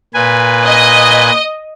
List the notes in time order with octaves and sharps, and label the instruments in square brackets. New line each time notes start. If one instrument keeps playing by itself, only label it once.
[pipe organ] A#2 B4 G#5
[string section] D#5